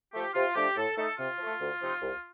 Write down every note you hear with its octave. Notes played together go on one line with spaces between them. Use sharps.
F3 A3 G4
C3 F4
F3 A3 D4 G4
A2 A4
A3 D#4 A4
C3 F4
F3 A3
D2
C3 F3 C4 D#4
C2